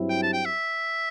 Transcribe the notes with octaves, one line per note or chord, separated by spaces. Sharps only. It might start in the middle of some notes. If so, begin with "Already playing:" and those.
Already playing: G2 F#3 C4 E4 G4
G5
A5
G5
E5